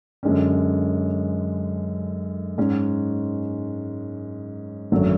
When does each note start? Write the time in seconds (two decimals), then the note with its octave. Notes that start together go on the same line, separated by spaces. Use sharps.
0.23 F#2 D3 G#3 C#4
2.58 G#2 G#3 C#4
4.92 G#1 F#2 D3 F#3 A3